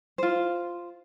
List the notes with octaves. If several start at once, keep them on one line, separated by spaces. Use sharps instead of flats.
F4 C5